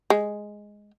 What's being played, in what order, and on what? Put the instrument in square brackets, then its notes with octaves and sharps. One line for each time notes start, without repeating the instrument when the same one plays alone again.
[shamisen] G#3